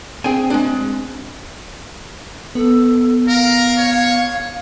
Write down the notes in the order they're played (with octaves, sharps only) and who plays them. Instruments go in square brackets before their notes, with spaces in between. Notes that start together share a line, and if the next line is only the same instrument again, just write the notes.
[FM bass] C4 [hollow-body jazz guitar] G#4 G5 G#5
[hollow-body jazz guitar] G#3 D4
[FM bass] B3 [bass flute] A4
[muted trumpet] A#4 [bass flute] F5
[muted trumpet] C#5